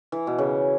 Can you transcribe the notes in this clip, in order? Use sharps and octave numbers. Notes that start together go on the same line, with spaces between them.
E3
B2
C#3